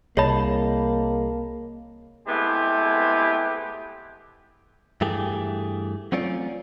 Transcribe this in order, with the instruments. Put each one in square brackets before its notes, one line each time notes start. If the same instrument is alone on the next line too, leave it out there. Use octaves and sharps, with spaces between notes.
[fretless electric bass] C2 [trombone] A#3 [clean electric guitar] G#4 D#5 A5 [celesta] C#5 B5
[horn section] G#3 A3 B3 C4 E4 G4
[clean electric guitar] G2 E3 A3 G4 G#4
F#3 A3 C4 C#4 F4 D5